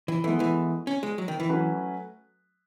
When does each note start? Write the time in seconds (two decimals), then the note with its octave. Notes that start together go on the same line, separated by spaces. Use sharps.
0.08 E3
0.24 E3 G#3 B3 E4 A4
0.40 E3
0.87 C#4
1.03 G#3
1.18 F#3
1.28 D#3
1.40 E3
1.49 F#3 A3 C#4 F#4 B4